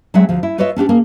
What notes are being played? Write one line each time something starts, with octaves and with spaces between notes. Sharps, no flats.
F#3 G#3 C4 G#4 E5 F#5
D2 F3
E4
F4 B4 C#5 D#5 E5
C#4 D4 F#4 G4
A#3 G#4 A#4